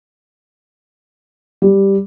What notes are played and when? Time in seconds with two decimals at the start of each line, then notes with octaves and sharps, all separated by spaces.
1.62 G3